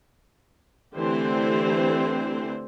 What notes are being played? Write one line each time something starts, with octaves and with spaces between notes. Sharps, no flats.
D3 E3 A3 C4 G4 C5